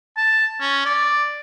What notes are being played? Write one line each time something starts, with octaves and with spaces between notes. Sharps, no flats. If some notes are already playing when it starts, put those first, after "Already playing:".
A5
C#4
D5